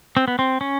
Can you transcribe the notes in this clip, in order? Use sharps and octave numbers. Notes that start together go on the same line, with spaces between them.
C4
B3
C4
C#4